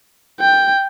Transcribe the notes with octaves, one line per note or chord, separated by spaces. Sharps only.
G5